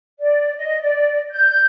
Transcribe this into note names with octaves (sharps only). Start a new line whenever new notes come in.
D5
D#5
D5
G6